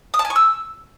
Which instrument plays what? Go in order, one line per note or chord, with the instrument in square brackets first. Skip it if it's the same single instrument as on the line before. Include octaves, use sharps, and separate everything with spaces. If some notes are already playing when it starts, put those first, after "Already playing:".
[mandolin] D#6
A5
G#5
C#6
E6